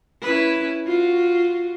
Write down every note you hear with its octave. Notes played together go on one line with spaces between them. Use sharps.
C#4 E4 B4
F4 F#4